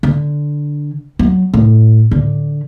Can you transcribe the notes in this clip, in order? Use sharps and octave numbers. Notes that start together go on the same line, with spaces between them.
D3
F#3
A2
D3